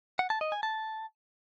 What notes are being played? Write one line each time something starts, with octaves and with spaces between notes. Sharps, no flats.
F#5
A5
D#5
G#5
A5